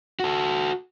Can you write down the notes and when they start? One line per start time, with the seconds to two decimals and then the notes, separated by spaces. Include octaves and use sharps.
0.20 F#4 A4